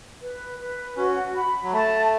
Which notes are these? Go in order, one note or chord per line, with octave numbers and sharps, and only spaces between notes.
B4
B4
C#4 F#4
B5
F#3
A3 A5